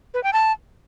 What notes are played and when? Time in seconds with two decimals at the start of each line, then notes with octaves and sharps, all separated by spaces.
0.14 B4
0.24 G5
0.33 A5